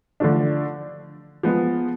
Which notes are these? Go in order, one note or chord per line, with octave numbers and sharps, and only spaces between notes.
D3 F3 A3 D4
F3 G#3 B3